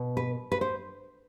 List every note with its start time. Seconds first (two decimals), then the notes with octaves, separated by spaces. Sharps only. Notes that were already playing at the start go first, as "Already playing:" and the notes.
Already playing: B2
0.17 B4
0.52 B4
0.61 C5